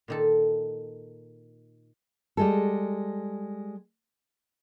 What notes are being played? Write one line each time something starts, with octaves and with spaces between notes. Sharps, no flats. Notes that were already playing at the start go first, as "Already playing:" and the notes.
A#2 D#3 A4
G3 G#3 A4